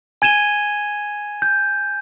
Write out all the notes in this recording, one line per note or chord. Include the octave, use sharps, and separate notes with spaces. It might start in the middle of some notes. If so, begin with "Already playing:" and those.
G#5 G#6 D#7 E7 G7
G6